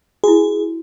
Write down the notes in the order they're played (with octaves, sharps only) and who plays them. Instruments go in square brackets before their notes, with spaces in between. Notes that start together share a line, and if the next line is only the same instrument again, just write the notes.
[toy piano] E4 F#4 [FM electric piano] G#4